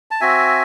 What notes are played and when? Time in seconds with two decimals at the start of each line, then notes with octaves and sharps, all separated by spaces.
0.11 A5
0.21 C4 F#4 E5 G#5